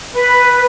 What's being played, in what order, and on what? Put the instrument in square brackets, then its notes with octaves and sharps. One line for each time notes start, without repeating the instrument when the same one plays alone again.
[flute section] B4